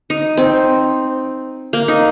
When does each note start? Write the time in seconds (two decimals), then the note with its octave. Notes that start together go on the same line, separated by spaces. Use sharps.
0.10 D#4
0.37 C4
1.73 A#3
1.88 D#4